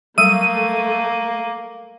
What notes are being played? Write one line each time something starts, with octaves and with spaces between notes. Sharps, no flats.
F#3 G3 A3 A#3 D#7